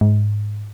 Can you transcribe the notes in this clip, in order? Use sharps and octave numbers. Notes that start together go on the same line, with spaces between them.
G#2